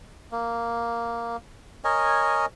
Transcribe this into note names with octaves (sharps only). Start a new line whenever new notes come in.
A#3
A#4 C#5 D#5 G#5